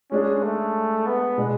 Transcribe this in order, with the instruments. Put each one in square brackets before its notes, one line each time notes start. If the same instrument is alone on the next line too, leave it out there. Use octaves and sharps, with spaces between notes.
[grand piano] G#3 D4 G#4 [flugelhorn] C#4
[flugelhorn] A3
B3
[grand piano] B2 G#3 D4